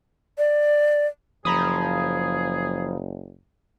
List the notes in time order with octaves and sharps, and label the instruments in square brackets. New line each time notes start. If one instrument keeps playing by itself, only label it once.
[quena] D5
[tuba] F#1 [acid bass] F3 [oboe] G#4 [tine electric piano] A#5 B5 D#6